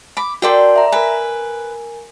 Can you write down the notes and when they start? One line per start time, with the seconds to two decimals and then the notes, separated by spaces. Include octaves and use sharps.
0.17 B5 D6
0.42 F#4 A4 A#4 D5 G5 C6
0.76 E5 A#5
0.92 A#4 B4 G#5